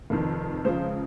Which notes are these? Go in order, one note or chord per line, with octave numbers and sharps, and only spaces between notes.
F1 F2 D#3
C#2 C#3 F3 C5